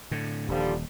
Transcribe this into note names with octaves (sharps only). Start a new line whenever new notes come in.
A2 D3
D#1 D3 F3 G3